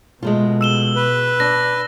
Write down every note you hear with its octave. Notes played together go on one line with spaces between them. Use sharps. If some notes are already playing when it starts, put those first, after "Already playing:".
B2 G#3 A3 F4
E6 E7 G7
B4
D4 A#6